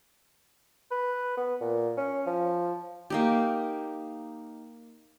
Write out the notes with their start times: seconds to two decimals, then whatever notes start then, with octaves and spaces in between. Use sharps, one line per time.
0.91 B4
1.37 B3
1.61 A#2
1.97 C#4
2.27 F3
3.10 A#3 D#4 G4